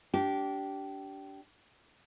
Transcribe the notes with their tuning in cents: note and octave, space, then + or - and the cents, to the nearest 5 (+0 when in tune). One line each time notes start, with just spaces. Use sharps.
D4 -25 G4 -20